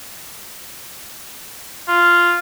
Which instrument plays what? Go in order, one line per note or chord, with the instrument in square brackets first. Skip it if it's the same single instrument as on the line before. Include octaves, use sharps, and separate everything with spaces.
[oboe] F4